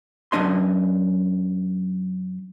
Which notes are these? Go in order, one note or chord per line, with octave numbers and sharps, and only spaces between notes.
F#2 F3 D4 D#5 C6